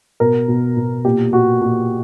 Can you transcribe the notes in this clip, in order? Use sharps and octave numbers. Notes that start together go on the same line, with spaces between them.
B2 A#4
B2
B2
A#2 G4
A#2 F#4
A#2 F#4